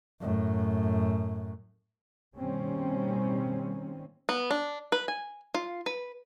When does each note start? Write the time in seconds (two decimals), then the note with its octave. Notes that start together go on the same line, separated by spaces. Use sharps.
0.21 F#2 A2
2.37 B2 D#3 G3 A#3 C4 C#4
4.29 B3
4.51 D4
4.92 B4
5.08 G#5
5.54 F4
5.86 B4